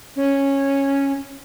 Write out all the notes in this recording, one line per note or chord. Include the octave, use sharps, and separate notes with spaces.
C#4